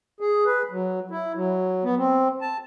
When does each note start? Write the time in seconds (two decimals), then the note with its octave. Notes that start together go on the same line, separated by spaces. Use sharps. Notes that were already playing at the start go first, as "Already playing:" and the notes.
0.20 G#4
0.46 B4
0.71 F#3
1.10 E4
1.35 F#3
1.84 B3
1.97 C4
2.41 A5